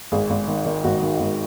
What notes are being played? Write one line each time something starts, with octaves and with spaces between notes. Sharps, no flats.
G#1 G#4
G#1
D#3
D#3
G#1 F#4
D#3
G#1